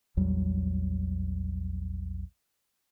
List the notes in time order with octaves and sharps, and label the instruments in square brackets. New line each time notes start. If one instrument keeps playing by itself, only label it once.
[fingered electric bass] A#1 E2 F#3 G3